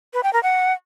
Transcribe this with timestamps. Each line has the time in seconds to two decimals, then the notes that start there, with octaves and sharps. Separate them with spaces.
0.14 B4
0.23 G5
0.33 A#4
0.43 F#5